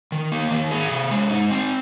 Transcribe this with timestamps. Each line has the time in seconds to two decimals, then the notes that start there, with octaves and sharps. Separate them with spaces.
0.12 D#3
0.32 A#3
0.51 D#3
0.71 G#4
0.91 C3
1.11 G#3
1.30 D#4
1.51 C4